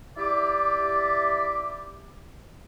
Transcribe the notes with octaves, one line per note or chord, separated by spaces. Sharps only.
E4 G4 D5